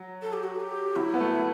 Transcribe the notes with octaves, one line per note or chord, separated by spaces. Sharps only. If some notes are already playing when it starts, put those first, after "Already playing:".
Already playing: F#3
A4
G4
F#4
A4
G4
F#3 E4
B3
A3